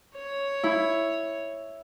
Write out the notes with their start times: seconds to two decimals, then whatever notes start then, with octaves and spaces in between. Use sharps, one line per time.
0.15 C#5
0.64 E4